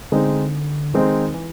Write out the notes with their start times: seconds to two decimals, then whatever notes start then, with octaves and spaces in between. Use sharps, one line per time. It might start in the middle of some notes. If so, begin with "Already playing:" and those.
0.12 D3 G#3 C4 D#4
0.94 D#3 G#3 C4 D#4
1.34 E3